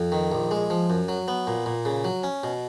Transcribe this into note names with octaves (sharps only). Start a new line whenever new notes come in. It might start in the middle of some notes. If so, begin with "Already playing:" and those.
Already playing: F2
D#3
A#1
G#3
F3
F#2
F#3
B3
A#2
A#2
C#3
F#3
C#4
B2